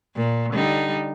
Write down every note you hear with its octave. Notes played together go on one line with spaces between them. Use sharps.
A#2
D3 G3 D#4